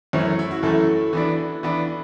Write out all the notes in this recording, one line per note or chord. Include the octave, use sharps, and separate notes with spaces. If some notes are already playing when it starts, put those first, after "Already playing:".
F#2 E3 A3 C#4
E4
F#4
F#2 E3 A3 A4
E3 B3 D4
E3 B3 D4